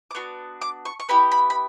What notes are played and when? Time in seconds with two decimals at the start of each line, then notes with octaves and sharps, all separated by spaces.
0.11 D6
0.15 B3 D4 F#4 C#6
0.61 D6
0.85 C#6
1.00 C#6
1.09 B3 E4 G4 B5
1.31 B5
1.50 B5